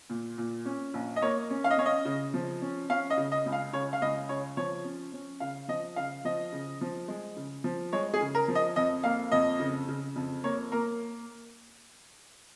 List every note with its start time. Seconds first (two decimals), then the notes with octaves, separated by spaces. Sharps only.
0.10 A#2
0.38 A#2
0.65 C#4
0.94 A#1
1.16 D#5
1.22 A#3 C#5
1.50 C#4
1.64 F5
1.71 D#5
1.78 C#4 C#5
1.86 D#5
2.05 C#3
2.34 F3
2.62 C#4
2.89 C#4 F5
3.10 D#5
3.17 C#3
3.32 D#5
3.46 C#2
3.52 F5
3.73 C#3 C#5
3.93 F5
4.02 C#2 D#5
4.29 C#3 C#5
4.57 F3 C#5
4.84 C#4
5.13 C#4
5.40 C#3 F5
5.68 F3 D#5
5.96 C#3 F5
6.25 F3 D#5
6.52 C#3
6.81 F3
7.08 G#3
7.36 C#3
7.64 F3
7.93 G#3 C#5
8.14 G#4
8.20 C#3
8.35 A#4
8.48 F3
8.55 D#5
8.76 F2 D#5
9.04 A#3 F5
9.32 F2 D#5
9.59 C#3
9.88 C#3
10.16 F2
10.44 A#3 C#5
10.72 A#3 A#4